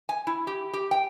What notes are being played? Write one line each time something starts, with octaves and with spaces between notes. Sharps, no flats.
G#5
E4
G4
G4
G5